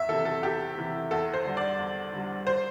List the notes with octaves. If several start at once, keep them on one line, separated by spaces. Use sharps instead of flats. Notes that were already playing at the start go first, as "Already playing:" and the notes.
Already playing: E2 E5
C3 E3 A4
A4
E2 G4
C3 E3
E2 A4
C5
D3 G3
D5
E2
D3 G3
C5